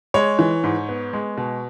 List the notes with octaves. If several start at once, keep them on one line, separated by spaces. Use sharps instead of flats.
G#3 C#5
E3
G#2
B3
G#3
B2